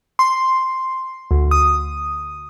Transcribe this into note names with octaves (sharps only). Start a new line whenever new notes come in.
C6
D2
D#6